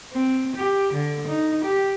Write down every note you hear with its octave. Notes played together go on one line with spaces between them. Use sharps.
C4
G4
D3
D#4
G4